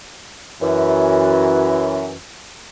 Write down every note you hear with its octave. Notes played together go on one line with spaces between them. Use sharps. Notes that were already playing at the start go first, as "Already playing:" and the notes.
F#2 E3